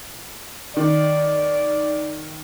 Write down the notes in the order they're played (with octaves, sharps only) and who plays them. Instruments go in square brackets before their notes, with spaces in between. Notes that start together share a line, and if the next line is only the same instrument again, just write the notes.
[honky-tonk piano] D#3 [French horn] D5